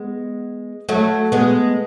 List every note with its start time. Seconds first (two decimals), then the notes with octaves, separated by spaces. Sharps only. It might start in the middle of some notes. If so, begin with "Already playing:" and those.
Already playing: G#3 B3
0.89 F#3 A3
1.32 G#3 B3